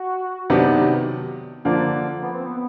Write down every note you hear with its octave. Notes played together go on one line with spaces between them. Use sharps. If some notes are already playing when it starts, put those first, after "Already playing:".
Already playing: F#4
C3 D#3 F#3 B3 D4
D3 F3 A#3 D4
B3
C4
B3